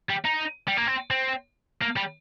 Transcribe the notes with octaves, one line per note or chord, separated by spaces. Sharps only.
G3
D#4
G3
A#3
C4
C4
A#3
G3